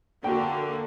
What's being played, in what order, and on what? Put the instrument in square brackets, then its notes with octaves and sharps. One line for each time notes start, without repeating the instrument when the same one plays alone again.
[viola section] D3 A#3 [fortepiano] F#4 G5